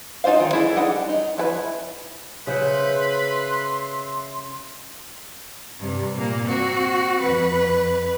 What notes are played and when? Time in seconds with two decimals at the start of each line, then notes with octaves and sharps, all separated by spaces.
0.24 D#4 F4 G#4 C5 F5
0.40 D#3
0.53 E4 G#4 A4 D#5
0.75 G3 D4 D#4 F#5
1.09 D#4
1.37 F3 E4 A4 B4
2.47 C#3 B4 C5 E5 F#5 C6
5.80 G2 C3
6.16 A#2 A#3
6.47 C4 F#4
7.22 F2 B4